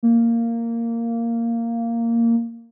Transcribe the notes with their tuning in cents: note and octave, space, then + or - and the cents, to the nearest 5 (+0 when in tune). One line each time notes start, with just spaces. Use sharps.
A#3 -10